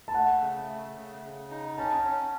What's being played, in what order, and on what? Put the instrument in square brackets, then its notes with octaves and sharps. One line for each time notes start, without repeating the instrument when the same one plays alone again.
[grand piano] A5
[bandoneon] A3 [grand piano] F#5
[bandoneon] C#3
A3
C#3
C#3
D#4
[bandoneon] C#4 [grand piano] A5
[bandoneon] C#4